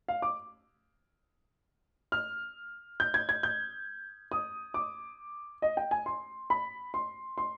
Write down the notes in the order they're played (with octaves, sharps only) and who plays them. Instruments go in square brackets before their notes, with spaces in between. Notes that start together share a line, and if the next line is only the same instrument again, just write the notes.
[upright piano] F5
D6
F6
G6
G#6
G#6
G6
D#6
D6
D#5
G5
G#5
C6
B5
C6
C6